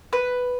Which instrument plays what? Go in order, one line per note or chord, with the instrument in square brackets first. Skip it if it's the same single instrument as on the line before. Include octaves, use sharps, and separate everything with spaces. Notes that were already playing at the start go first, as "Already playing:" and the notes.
[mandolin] B4